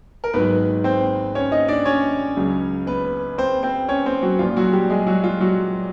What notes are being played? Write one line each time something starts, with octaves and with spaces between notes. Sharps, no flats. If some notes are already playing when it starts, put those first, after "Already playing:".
A#4
G#1 G#2 D#3 F#3 B3 B4
C4 C5
C#4 C#5
D#4 D#5
D4 D5
C#4 C#5
C#2 C#3 F#3
B3 B4
C4 C5
C4 C5
C#4 C#5
C4 C5
F#3 F#4
A#1 A#2 F3 F4
F#3 F#4
G3 G4
G#3 G#4
F#3 F#4
F4
F#3 F#4